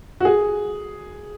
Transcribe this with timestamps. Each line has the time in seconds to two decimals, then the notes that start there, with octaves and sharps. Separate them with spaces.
0.20 F#4
0.25 G#4